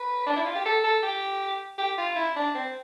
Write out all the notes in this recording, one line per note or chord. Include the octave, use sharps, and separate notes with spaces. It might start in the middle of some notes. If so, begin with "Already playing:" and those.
Already playing: B4
D4
E4
F4
G4
A4
A4
G4
G4
F4
E4
D4
C4